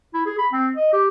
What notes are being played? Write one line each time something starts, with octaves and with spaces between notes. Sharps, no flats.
E4
G#4
B5
C4
D#5
G4